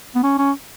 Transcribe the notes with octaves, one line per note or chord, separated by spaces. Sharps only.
B3
C#4
C#4